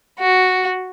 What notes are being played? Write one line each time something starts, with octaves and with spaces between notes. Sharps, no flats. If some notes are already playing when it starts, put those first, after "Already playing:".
F#4